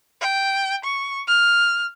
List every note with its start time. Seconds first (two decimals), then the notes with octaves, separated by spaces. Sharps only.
0.21 G5
0.84 C#6
1.27 F6